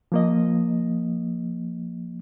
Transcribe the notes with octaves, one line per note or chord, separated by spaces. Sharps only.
F3 A#3 D#5